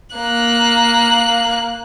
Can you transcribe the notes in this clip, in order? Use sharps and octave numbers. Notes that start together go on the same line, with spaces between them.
A#3 F#6